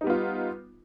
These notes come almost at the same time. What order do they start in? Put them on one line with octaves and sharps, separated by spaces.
D#4 G3 B3 F4